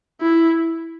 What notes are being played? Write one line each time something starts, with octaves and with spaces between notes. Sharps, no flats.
E4